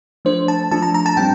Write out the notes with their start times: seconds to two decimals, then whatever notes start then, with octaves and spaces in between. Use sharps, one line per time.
0.25 F3 A3 D4 C5
0.48 A5
0.71 F3 A3 D4 A5
0.82 A#5
0.94 A#5
1.06 A5
1.17 A2 G3 C4 G5